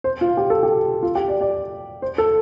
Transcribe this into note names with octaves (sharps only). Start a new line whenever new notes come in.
C5
F4
G4
A4
G4
F4
G4
D5
D5
C5
A4